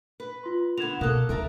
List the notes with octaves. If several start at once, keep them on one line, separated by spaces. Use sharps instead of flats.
B4
F4 C6
D3 B3 G#6 E7 F7
B2 A#3 A4 F5 D#6 F#6
D2 D#3 A4 A#4 E5